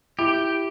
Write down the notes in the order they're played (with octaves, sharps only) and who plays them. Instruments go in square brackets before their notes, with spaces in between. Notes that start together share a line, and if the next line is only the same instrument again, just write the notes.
[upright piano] E4 [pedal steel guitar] G4